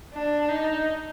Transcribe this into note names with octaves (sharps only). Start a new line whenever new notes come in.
D4
D#4